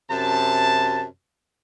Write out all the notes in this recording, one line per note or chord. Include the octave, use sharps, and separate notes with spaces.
F#2 C3 A5